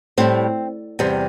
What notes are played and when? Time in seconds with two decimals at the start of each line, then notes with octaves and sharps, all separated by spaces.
0.18 A2 G3 C4
0.99 E2 C3 G3